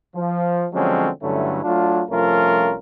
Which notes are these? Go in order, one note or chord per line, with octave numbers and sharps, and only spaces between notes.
F3
D3 F3 F#3 G#3 C4 C#4
G2 D3 F#3 A3 C#4 E4
F#3 A3 D4 F4
C2 F3 A3 C#4 F4 A#4